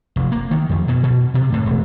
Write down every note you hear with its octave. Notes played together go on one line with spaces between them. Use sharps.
F1
A#3
D#3
F2
B2
B2
C3
A2
E1